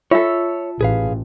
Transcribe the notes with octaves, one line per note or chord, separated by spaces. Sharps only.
F4 A4 C#5 E5
A1 G#4 B4 F5